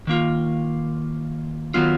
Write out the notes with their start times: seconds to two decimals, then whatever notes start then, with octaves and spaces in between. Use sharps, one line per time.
0.07 D#3 A#3 F4
1.74 D#3 F#3 B3 F4